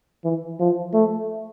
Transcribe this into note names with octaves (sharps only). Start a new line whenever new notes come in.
E3
F3
A3